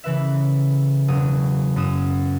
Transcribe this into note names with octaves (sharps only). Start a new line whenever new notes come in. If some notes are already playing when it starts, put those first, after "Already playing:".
C#3 E3 B4 E5
E1 F#3 G#4 D#6
F#2 D#6 E7